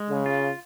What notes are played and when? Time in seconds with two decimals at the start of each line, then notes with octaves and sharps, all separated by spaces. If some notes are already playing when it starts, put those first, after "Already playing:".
Already playing: G#3
0.09 C#3
0.26 F4